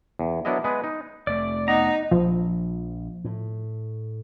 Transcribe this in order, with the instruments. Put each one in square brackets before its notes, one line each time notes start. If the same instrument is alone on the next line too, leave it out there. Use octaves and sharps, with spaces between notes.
[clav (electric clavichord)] E2
F#3 B3 D4 E4 A#4 D#5
G#3 B3 G#4 B4
D#4
[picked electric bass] F1 A3 [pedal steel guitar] D5
[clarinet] B3 [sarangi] D#4 [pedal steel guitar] A#5
[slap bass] A#1 [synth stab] F3
[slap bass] A2